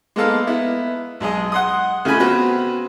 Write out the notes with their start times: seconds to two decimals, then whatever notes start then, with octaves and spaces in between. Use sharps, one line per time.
0.16 G#3 A#3 B3 D#4 A4 F5
0.47 B3 E4
1.20 B1 G#3 G#4 D#5
1.52 F#5 C6 D#6
2.05 C#3 A3 F4 G#5 B5
2.19 B3 C4 F#4 B4